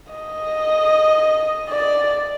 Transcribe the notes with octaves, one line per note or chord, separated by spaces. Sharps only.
D#5
D5